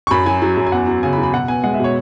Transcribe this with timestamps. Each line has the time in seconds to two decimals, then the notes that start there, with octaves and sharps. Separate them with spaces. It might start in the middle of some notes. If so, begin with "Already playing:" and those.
0.07 C#6
0.11 F#2 B5
0.26 F#3 G#5
0.42 F#3
0.57 F#2
0.67 G#5
0.72 E2 F#5
0.88 F#3
1.03 C#3 G#5
1.13 B5
1.18 F#3
1.23 B5
1.33 B2 F#5
1.48 B3 G#5
1.63 G#3 F#5
1.74 E5
1.80 B2 C#5